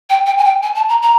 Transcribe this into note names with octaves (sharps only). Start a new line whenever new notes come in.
G5
G5
G#5
G5
G#5
A5
A#5
A#5